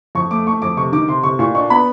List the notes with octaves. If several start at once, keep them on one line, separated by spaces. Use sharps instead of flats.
F2 C#6
A3 D6
A3 C#6
F2 D6
C3 C#6
D#3 D6
C3 C6
C3 C#6
A#2 C#6
D4 C#6
B3 B5